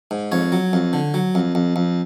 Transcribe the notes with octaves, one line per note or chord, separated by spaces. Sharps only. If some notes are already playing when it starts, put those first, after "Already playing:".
G#2
F2 C#5
F#3
F2
D3
F#3
F2
F2
F2